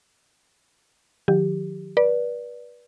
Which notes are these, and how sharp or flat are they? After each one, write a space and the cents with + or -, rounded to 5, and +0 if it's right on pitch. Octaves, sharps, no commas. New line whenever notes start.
D#3 -20 F#3 -40 G4 +0
B4 -30 D5 +0